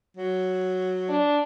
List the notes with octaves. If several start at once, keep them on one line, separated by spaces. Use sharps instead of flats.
F#3
D4